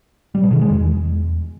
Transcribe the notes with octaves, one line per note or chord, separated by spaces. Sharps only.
G3
B2
D#3
G#3
E2